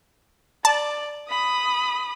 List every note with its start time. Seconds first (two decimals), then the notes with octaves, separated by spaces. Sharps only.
0.65 D5 A5
1.28 B5 D#6